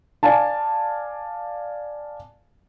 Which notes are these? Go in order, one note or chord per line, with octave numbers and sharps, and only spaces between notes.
D5 F5 G#5 A5